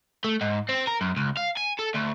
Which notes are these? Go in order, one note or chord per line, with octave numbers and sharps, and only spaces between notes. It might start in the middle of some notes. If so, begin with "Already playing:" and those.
A3
G#2
C4
A#4
F#2
C#2
F5
G#5
A4
D2